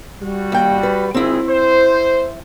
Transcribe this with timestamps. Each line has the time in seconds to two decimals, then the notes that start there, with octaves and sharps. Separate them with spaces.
0.22 G3 F#4
0.52 D#2 G5
0.83 B4
1.14 G#1 C4 E4 G#4
1.49 C5